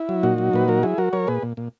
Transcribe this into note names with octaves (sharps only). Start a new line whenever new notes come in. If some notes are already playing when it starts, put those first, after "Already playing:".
Already playing: E4
F#3
A#2 D#4 F#4
F#3
A#2 B4
F#3 A#4
F#3 E4 G#4
F#3 F#4 A#4
F#3 A#4 C#5
A#2 G#4 B4
A#2
A#2